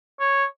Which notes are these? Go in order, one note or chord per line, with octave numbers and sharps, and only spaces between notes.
C#5